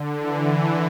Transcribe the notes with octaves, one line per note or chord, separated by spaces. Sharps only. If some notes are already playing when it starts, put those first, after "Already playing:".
Already playing: D3
E3